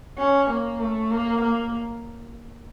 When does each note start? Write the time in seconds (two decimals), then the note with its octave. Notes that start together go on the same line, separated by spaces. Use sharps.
0.18 C#4
0.49 A#3
0.80 A3
1.10 A#3
1.41 A#3